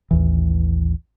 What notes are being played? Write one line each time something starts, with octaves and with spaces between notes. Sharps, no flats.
A1 D#2 E3